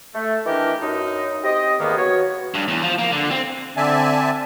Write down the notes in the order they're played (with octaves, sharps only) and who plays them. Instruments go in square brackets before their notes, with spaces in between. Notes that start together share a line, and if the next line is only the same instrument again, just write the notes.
[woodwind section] A3
D#3 E3 D4 G4 A#4
F#2 D#4
C4 G4 D#5
E2 G#2 D#3 A#3 B3
F#3 B3 F#4 C#5
[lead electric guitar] G2
E2
F3
A#3
D3
C4
[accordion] D3 C4 D5 E5 G#5 A5